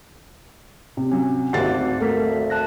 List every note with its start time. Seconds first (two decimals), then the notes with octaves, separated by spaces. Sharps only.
0.97 C3
1.11 F#3 C#4
1.53 G#1 D2 F#4 G4 D5 F#5 A6 C7
2.00 A3 A#3 A4 A#4 B6
2.50 A5 F#6 A#6